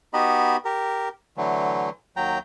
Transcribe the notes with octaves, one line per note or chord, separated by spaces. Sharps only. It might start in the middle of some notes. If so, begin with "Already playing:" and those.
B3 D#4 F#4 G4 D#5 B5
G4 A#4
D3 E3 F#3 A3
D#2 F#3 G5 A#5